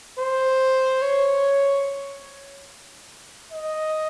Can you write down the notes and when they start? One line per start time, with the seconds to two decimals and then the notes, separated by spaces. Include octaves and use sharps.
0.19 C5
1.02 C#5
3.52 D#5